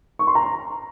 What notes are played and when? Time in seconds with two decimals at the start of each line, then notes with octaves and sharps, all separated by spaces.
0.19 C#6
0.27 C6
0.35 A#5